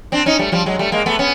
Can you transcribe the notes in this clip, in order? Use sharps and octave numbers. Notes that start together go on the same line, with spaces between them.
C4 D4
C#4 D#4
G3 A3
F3 G3
F#3 G#3
G3 A3
G#3 A#3
A3 B3
B3 C#4